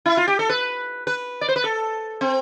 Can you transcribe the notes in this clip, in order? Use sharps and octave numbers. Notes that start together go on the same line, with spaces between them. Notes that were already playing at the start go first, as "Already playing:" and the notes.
E4
F4
G4
A4
B4
B4
D5
C5
B4
A4
C4